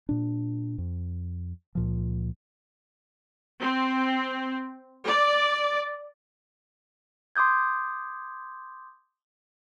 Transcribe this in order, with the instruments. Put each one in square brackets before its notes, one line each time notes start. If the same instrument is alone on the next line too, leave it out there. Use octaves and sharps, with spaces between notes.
[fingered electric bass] A#2 D4
F2
C#2 A#2 F3
[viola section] C4
D5
[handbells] C6 D6 D#6 G6 G#6